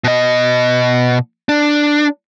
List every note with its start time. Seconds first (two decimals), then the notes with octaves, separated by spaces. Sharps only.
0.04 B2 D#5
1.49 D4